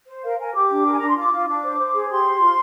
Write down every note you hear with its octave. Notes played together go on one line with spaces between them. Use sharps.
C5
A#4 F5
A#4 G#5
G4 D6
D4
A#4 G5
G#5
D4 A#5
C6
F4 D6
F4
D4 D6
C5
C5
G#4
G4 C6
C5
F4